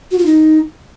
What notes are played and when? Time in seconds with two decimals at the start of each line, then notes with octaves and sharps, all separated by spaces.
0.11 F#4
0.18 F4
0.25 D#4